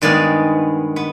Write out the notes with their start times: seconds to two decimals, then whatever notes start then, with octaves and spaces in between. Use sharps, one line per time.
0.02 G2 D#3 G#3 B3 D5
0.96 B3